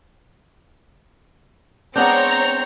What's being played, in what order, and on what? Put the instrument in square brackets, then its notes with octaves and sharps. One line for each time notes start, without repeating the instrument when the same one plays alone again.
[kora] G#3 B3 D4 [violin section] C4 C#5 A#5 [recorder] G6